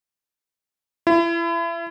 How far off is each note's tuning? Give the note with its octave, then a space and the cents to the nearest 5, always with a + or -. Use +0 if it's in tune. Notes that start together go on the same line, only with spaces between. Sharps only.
E4 +35